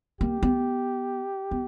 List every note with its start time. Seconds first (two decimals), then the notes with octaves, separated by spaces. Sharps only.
0.21 A#3 G4
0.43 B3
1.51 B3